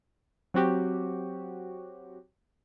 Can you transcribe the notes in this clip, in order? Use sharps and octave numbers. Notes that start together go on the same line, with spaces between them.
F#3 C4 F#4 G4